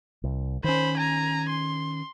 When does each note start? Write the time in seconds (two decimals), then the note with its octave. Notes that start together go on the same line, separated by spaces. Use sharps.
0.24 C2
0.64 D#3 C#4 C5 B5
0.98 G#5 A#5
1.50 C6